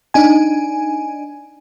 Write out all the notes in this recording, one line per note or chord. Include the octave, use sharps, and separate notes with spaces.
D4 D#4 G#5